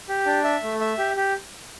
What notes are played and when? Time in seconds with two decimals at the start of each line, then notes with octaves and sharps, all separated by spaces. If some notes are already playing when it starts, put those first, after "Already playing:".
0.09 G4
0.26 D4
0.44 E5
0.63 A3
0.81 E5
0.98 G4
1.17 G4